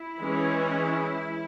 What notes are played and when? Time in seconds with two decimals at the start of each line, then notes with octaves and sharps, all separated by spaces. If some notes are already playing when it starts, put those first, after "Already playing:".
Already playing: E4
0.22 E3 G#3 C#4